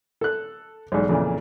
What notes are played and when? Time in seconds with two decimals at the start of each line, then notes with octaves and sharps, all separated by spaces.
0.21 A4 F#6
0.92 B1 E2 G#2
1.09 F2 A#2 C#3 E3